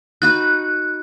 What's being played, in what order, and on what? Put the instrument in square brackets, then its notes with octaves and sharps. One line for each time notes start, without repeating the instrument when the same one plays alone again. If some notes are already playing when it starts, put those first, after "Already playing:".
[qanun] D#4 F#4 B4 [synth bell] F#6